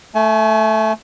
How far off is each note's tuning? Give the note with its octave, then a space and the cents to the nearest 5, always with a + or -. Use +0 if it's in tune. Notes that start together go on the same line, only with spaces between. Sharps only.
A3 +0 G#5 +35